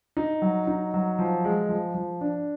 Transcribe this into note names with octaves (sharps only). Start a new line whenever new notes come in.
D#4
F#3
D#4
F#3
F3
G#3
F3
F3
D4